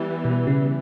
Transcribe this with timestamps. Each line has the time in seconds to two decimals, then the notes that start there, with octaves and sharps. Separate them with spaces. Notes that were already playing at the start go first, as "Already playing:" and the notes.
Already playing: E3 G3 B3
0.25 B2
0.47 C#3